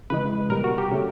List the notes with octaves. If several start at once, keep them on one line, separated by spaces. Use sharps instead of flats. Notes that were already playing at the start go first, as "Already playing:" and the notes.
C#3 E3 G#3 B4
B2 G3 A#4
F#4
G4
C#3 F#3 A3